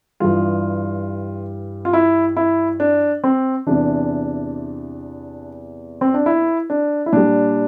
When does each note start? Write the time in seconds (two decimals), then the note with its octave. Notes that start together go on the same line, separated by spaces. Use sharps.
0.20 G2 E3 G3 F4
1.85 F4
1.93 E4
2.37 E4
2.80 D4
3.24 C4
3.67 E2 C3 E3 D4
6.01 C4
6.14 D4
6.26 E4
6.70 D4
7.06 E4
7.13 A#2 G3 D4